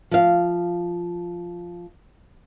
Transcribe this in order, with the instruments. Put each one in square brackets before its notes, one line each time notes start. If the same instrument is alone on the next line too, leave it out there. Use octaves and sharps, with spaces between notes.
[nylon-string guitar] F3 F5